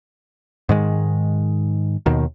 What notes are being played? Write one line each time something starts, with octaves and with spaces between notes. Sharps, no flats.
G#2 D#3 G#3
D#2 B2 D#3